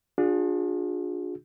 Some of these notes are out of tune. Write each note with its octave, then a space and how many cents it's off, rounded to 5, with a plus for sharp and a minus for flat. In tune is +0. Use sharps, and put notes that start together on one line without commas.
D4 +0 F4 +45 G#4 -10